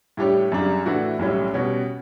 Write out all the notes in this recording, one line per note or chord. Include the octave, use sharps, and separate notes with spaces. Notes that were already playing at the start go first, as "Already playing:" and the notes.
A2 G3 D4 G4 C#5
F#2 C#3 G3 D4
A2 E3 A3 D4 F#4
B1 A2 G3 C#4
B2 G3 C#4 F#4